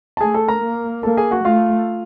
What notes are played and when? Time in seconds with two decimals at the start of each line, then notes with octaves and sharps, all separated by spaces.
0.17 A5
0.21 A3 G#4 G#5
0.34 A4 A5
0.48 A#4 A#5
0.62 A#3
1.03 A#3 A4 A5
1.17 G#4 G#5
1.31 F#4 F#5
1.45 A3 F4 F5